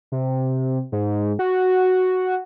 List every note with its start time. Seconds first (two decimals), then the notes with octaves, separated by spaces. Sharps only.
0.12 C3
0.92 G#2
1.39 F#4